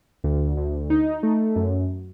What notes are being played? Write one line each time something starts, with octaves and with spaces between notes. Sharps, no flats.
D2
D2
D#4
A3
F#2